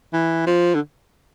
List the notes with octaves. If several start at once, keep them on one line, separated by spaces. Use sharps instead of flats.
E3
F3
D3